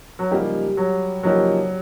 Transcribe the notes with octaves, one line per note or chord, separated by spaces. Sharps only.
F#3
C#3 F3 G3 A#3 D#4 G4
F#3
C#3 F3 F#3 A#3 D#4 G4